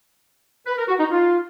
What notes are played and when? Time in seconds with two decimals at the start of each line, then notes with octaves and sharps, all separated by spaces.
0.67 B4
0.78 A#4
0.88 F#4
1.00 D#4
1.10 F4